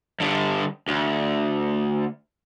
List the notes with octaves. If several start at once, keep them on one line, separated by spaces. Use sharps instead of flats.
G2 D3
D2